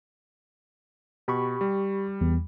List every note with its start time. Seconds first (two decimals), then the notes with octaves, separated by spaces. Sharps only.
1.28 B2 G4 B5 C#6
1.61 G3
2.21 E2